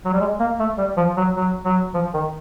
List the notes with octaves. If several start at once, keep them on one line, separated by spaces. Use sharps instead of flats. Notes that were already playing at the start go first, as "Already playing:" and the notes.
F#3
G3
G#3
A#3
A3
G3
F3
F#3
F#3
F#3
F3
D#3